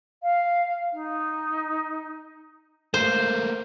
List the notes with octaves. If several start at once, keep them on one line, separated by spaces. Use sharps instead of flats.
F5
D#4
A3 A#3 C5